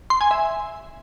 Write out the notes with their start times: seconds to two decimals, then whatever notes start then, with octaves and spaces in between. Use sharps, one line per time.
0.10 C6
0.21 G#5
0.31 E5